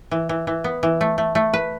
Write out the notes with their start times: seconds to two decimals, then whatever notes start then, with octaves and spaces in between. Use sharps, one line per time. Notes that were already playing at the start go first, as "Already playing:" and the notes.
0.11 E3
0.29 E3
0.47 E3
0.64 B3
0.83 E3
1.01 A3
1.18 A3
1.35 A3
1.54 B4